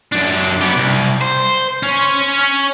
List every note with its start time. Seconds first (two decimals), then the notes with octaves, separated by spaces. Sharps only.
0.12 F#2 D4
0.61 B3 G4
0.77 C2
1.21 C5
1.83 C#4